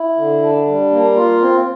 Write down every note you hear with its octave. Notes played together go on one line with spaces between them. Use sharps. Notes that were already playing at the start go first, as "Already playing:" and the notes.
Already playing: E4
D3
D4
G3
A#3
F4
C4